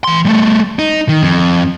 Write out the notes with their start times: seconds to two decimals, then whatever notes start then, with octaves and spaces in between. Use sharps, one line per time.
0.04 E3 C6
0.25 G3 A3
0.79 D#4
1.09 D#3
1.23 F2